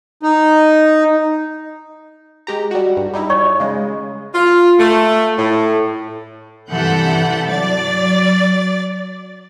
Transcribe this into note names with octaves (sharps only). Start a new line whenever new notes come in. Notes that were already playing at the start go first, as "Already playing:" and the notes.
D#4
G#3 G4 A#5
G3 F#4
G2
G3 D#4 E4
C#5 D5 C#6
C#3 G#3
F4
A3
A2
G2 C3 E3 A4 F#5 G6
F#3 D5 A6